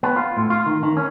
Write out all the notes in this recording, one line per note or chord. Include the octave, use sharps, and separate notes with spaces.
B3
F4
A2
F4
D#3
D#3
C#4